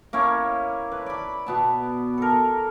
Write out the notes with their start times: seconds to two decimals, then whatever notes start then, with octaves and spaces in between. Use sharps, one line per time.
0.13 A#3 C#4 E4 C#5
0.92 B4
1.06 D5 B5
1.46 B2 B3 A5
2.18 A4 A#4